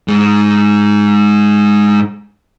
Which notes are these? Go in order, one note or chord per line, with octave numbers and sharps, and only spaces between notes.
G#2 G#3